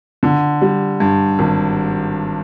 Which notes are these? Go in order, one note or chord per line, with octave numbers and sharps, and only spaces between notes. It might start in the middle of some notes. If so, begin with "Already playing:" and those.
D3
G3
G2
G#1